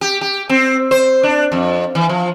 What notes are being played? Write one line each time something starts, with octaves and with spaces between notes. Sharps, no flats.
G4
G4
C4
C5
D4
F2
E3
F3